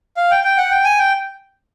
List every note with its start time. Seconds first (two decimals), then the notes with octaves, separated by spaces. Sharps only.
0.17 F5
0.31 G5
0.44 G5
0.57 F#5
0.71 G5
0.84 G#5
0.99 G5